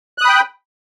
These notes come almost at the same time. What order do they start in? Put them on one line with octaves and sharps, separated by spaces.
F#6 D#6 B5 G5